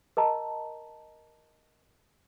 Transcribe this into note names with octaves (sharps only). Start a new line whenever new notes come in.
A#4 D#5 A5 A#5